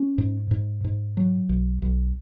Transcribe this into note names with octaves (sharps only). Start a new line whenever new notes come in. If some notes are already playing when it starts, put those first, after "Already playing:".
Already playing: C#4
G#2
G#2
G#2
F#3
B1
B1